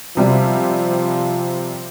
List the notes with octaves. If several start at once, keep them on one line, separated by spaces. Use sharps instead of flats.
C3 F3 G3